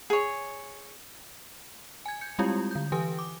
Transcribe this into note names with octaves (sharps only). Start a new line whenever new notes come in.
G#4 C#5
G#5 G#6
G6 C#7
G3 G#3 C4 E4 F4 G4
D3 G6
E3 G4 B4 G#5 D#6
D6